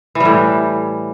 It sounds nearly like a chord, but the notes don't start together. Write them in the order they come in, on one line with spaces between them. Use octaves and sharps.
E3 G3 A2